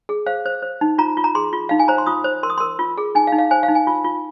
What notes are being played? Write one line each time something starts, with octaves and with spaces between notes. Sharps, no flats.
G#4
C5 F5
C5
C5
D#4
F4 A#5
F4
A#5
G#4 C6
F4
D#4 F5
G#5
C5 A#5
C6
F4 D#6
C5
A#4 C6
D#6
A#4 C6
F4
G#4
D#4 G#5
F5
D#4
F5
C5 G#5
F5
D#4
G#5
F4
F4